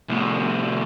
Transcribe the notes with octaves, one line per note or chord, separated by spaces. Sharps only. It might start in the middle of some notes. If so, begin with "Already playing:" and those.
C2 A2